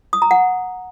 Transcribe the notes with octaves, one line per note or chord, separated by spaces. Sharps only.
D#6
A#5
F#5